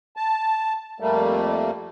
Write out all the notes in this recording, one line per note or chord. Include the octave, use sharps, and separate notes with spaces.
A5
F2 G3 A3 A#3